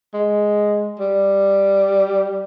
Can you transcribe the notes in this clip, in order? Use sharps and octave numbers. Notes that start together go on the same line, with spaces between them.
G#3
G3